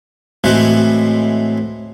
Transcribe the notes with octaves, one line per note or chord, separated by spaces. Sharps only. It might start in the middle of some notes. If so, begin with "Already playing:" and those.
A2 E3 G#3 C4 F#4